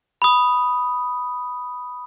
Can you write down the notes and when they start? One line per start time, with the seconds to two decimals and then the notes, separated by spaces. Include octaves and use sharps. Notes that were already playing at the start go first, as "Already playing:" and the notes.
0.22 B5 D#6